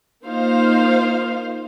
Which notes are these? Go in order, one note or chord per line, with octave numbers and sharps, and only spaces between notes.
A#3 D#4 F4 C5 F5